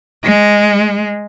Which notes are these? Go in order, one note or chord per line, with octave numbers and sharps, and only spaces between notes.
G#3